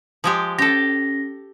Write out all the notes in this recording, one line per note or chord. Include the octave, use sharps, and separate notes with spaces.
F3 G#3 G4
C#4 G4 A4 A#6